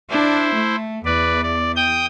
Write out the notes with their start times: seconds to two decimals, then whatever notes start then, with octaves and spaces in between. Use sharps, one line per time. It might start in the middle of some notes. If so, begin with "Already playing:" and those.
0.11 D4 E4 C5
0.54 A3
1.05 E2 B4 D5
1.43 D5
1.76 G5 D#6 G6